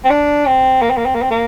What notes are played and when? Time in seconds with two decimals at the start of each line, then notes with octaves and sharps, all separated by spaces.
0.04 C4
0.10 D4
0.46 C4
0.82 A#3
0.90 C4
0.97 A#3
1.06 C4
1.15 A#3
1.22 C4
1.30 A#3